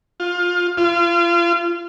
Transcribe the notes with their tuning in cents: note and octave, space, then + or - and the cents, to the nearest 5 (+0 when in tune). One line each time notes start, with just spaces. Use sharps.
F4 +20
F4 -30